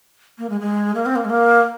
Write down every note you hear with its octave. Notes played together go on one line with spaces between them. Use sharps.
A#3
G#3
G#3
A#3
C4
A#3
G#3
A#3